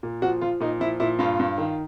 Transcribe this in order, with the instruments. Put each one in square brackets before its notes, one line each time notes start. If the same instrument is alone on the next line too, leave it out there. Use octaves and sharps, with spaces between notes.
[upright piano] A#2
F3 F#4
F3 F4
A#2 D#4
F3 E4
A#2 E4
G2 F4
G2
D#3